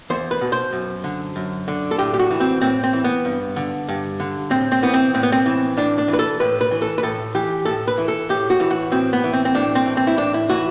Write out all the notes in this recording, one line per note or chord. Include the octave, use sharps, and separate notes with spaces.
E2 C5
B4
B2
C5
F#2
D3
F#2
D3
A4
A2 G4
G4
F#4
E3
C4
A2 C4
C4
E3
B3
G2
D3
G2
D3
A2 C4
C4
E3 B3
C4
A2 C4
B3
C4
E3
A2 D4
D4
E3
B4
A4
A2 B4
B4
E3
A4
B4
A2 A4
E3 G4
A2 A4
B4
E3
A4
A2 G4
F#4
E3
F#4
A2 C4
B3
E3
C4
C4
A2 D4
C4
E3
C4
E4
A2 D4
E4
E3 F#4